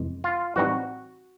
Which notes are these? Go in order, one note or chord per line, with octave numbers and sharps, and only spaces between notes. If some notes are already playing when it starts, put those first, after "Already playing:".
Already playing: F2 C3 E3 G#3
F4
A2 E3 G3 C4 D#4 F#4